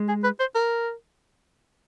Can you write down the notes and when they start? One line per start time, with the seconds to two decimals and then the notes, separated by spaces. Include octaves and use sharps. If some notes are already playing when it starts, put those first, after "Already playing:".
Already playing: G#3
0.09 G#4
0.24 B4
0.40 C5
0.55 A#4